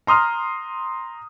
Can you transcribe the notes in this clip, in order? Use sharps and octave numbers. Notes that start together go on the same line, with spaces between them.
A#5 C6 D#6 F6